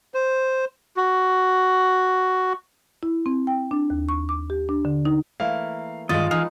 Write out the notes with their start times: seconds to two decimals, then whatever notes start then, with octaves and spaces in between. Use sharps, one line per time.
0.14 C5
0.97 F#4
3.03 E4
3.26 C4
3.47 G5
3.71 D4
3.90 D#2
4.09 C#6
4.29 D6
4.50 G4
4.69 D4
4.85 D3
5.05 D#4
5.40 E3 A3 A#3 F5
6.09 G2 D#3 G#3 D#4 F4 D5 D#5 A6
6.31 E3 D#4 G#4 B4 F5